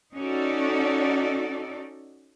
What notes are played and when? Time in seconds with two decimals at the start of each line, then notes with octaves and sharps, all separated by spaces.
0.15 C#4 D#4 F#4 A4 D5